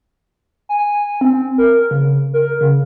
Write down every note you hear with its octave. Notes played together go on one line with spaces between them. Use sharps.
G#5
C4
A#4
C#3
A#4
C#3